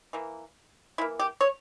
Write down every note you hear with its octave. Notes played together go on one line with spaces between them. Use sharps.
E3 A#3
E3 A#3 E4
G4
C#5